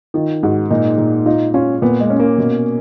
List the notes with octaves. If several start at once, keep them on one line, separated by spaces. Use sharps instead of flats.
D#3 F4
G#2 F#4
A#2 D#4
A#2
D#4 F4
C#4 F4
A#2 B3
G#3
C#4
A#3
B2